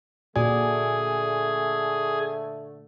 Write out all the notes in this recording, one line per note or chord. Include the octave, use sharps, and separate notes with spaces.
A#2 D3 A3 F#4 G#4 D5 G#5